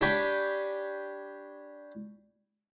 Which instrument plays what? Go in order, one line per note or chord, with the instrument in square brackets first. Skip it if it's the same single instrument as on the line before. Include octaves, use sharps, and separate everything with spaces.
[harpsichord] D4 G4 C#5 G5 G#5 B5